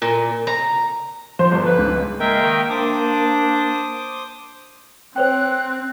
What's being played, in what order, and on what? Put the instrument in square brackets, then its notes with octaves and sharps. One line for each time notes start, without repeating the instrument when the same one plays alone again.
[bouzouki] A#2
A#5
[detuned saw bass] F3 [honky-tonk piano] C5
[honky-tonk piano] G1
[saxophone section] B4
[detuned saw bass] C#2 [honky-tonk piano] G#2
[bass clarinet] G#3 [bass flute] A#3 [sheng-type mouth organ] A#4 E5 G5
[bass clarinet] D#3
[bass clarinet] D4 [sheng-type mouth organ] C5 D6 D#6
[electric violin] C4 [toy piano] C5 C#5 G5 [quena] F#6